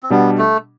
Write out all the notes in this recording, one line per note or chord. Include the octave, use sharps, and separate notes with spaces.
C4
B2 G3 B3 D4
A3